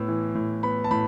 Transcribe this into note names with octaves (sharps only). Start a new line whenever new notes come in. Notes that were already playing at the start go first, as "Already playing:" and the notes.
Already playing: A2 B3 E6
E3
A2
B3 B5
A5
A2 B5